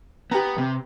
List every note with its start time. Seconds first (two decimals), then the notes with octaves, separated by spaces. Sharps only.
0.31 B3 G4 B4 A#5
0.58 C3